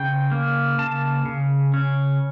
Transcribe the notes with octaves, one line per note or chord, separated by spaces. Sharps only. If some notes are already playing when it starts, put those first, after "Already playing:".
Already playing: C#3 G5
A#3
C#3 A5
C#3
C#4